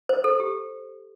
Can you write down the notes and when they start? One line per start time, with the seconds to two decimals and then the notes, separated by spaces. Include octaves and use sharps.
0.09 C5
0.24 A4
0.40 G4